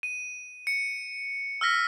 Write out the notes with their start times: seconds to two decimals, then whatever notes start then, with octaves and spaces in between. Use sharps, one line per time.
0.03 D#7
0.67 C#7
1.61 E6 F6 A#6 B6